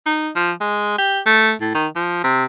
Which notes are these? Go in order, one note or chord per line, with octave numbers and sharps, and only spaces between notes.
D#4
F3
G#3
G4
A3
A2
D#3
F3
C3